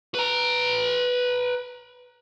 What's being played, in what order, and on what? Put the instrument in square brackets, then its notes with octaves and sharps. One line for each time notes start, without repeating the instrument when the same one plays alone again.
[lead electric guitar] B4 A#5